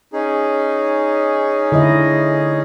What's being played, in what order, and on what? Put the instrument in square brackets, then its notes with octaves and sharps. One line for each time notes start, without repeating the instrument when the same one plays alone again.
[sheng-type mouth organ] C#4 D#4 G#4
[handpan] D3 E4 D#5